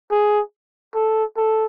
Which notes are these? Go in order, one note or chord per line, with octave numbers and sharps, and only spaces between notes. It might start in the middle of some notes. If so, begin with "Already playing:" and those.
G#4
A4
A4